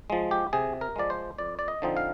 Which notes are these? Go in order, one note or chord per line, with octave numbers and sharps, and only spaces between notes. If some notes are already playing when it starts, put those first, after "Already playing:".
F3 G#3
G4
C3 G#4
A#4
F3 G#3 D5
C5
F2 D5
D5
D#5
D3 F3 C4 D#4
F5